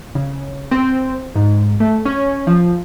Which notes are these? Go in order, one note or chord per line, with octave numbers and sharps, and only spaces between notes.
C#3
C4
G#2
A3
C#4
F3